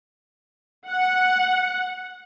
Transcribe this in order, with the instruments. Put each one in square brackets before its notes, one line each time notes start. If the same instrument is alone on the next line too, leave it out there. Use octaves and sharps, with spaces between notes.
[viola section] F#5